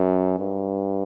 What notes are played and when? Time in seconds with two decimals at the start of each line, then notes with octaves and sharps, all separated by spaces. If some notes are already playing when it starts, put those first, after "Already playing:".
Already playing: F#2
0.39 G2